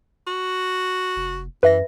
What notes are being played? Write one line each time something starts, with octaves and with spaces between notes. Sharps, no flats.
F#4
F1
F#2 E3 B4 E5 A#6